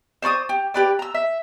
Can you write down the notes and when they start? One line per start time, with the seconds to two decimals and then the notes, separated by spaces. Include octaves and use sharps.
0.22 C5 D5 C#6 D#6
0.49 G4
0.74 G4 B4 D5
0.99 A#5 E6
1.14 E5